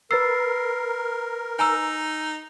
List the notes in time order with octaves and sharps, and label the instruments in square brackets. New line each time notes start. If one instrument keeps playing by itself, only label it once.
[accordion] A#4 [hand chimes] B4 A6 C7 [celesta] E6
[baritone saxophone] D#4 [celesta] G#5 A#5 E6